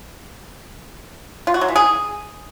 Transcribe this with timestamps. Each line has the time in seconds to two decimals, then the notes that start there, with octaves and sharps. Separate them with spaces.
1.47 F4
1.54 F#4
1.61 F#3
1.68 E3
1.76 G#4